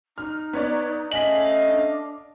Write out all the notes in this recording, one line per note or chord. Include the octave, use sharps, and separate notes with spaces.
D#4 F6
B3 C#5 D5
A3 C#4 D#5 F5 G#5 B6 F#7
D4